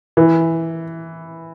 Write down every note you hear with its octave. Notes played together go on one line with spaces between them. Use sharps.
E3